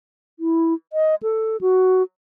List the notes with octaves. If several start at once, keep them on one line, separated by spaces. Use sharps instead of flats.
E4
D#5
A4
F#4